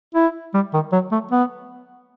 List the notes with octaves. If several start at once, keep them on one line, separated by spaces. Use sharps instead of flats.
E4
G3
D#3
F#3
A3
B3